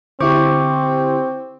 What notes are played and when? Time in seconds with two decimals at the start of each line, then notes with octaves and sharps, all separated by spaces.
0.20 D3 C4 E4 G4 C5 C#6 D6